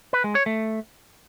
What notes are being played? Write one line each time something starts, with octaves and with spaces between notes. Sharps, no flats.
B4
G#3
C#5
A3